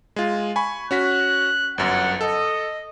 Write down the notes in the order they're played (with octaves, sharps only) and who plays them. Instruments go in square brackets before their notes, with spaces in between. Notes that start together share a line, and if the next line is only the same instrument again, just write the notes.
[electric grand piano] G#3 F4
G#5 B5 C#6
[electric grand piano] C#4 F#4 B6 [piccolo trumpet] F#6
[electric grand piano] G1 F#2 [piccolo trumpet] F#5
[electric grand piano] A4 [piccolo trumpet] D#5